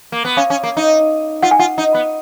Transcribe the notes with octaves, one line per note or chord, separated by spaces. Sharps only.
A#3
B3
C#4 F5
C#4
A#3
D#4
F4 F#5
G#5
F4 F#5
D#4
B3